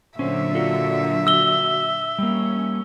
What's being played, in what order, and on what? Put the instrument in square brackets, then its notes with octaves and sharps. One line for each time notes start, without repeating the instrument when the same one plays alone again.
[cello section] A#2 D3 F#3 [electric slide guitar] C#4 C5 [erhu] E5
[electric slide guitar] F4 F#4 A4
[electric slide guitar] F#4 [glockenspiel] E6 G7
[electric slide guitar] G3 A#3 [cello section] C#4